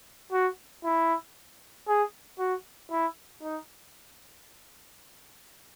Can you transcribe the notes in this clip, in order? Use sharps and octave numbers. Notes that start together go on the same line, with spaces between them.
F#4
E4
G#4
F#4
E4
D#4